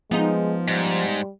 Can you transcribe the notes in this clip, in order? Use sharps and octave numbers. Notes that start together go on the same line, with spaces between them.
F3 G#3 B3 D#4
G#2 G3